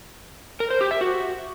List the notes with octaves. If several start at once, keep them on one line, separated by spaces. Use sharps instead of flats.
A#4
C5
G4
E5
F#4